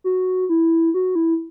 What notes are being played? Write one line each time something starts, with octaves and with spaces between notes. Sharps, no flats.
F#4
E4
F#4
E4